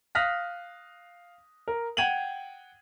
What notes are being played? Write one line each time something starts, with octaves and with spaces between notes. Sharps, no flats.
F5 D#6 F6 F#6 A#6 B6
A#4
F#5 G5 G#6 D#7 F7 F#7